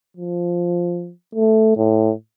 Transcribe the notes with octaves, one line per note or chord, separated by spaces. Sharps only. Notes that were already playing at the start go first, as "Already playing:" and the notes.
F3
A3
A2